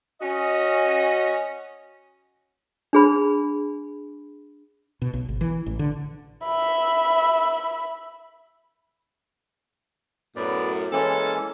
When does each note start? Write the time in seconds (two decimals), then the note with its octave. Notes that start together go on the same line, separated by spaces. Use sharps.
0.21 C#4 F#4 D#5
2.93 D4 G#4 B5
5.02 B2
5.14 B1
5.29 G#1
5.41 E3
5.66 A1
5.79 D3
6.44 E5 B5
10.36 F#2 A2 B3 D5
10.93 E3 G#3 A#3 C#4 A4